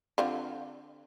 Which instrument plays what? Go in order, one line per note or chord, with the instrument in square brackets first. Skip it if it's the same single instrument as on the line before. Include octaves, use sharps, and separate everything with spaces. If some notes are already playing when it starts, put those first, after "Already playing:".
[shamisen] D3 C4 F4